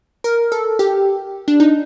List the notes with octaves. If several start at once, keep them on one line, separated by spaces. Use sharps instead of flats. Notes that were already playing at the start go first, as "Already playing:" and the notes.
A#4
A4
G4
D4
D#4